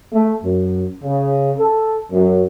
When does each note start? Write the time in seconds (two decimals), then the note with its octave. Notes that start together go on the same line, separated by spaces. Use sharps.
0.14 A3
0.44 F#2
1.02 C#3
1.59 A4
2.12 F#2